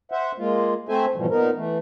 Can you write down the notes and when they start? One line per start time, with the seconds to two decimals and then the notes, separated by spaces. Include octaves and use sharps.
0.12 C5 E5 F#5
0.38 G#3 A#3 F4
0.89 A3 C4 A4 C5 E5 G#5
1.16 G#2 B2 E3 F3 G3
1.30 A#2 B3 D#4 A#4
1.55 E3 A3